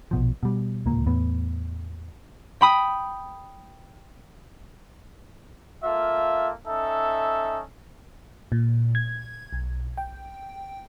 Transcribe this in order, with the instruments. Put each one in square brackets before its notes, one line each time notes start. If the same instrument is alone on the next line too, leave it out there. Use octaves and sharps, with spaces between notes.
[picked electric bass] A#1 B2 F3
B2 G3
D1 C#2 A#2 A#3
E2 A2 B3
[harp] G5 B5 D#6
[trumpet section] A#3 F4 A4 E5
C#4 D#4 A4 E5
[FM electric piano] A#2
G#6
B1
G5